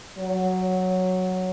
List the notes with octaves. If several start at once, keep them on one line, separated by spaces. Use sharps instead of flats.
F#3